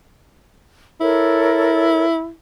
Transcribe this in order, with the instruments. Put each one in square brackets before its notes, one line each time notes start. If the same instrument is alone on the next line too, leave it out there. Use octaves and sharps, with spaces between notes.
[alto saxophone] E4 [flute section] A4 A#4 C#5